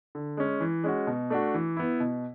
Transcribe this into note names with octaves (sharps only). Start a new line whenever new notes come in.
D3
G#3 C#4
E3
G#3 C#4 F#4
B2
A3 D4 F#4
E3
B3 E4
B2